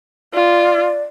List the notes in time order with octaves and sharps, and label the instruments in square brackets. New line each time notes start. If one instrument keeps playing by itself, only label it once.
[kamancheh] F4 [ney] D5